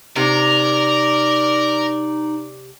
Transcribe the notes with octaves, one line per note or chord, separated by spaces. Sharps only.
C3 D#4 A#4 D5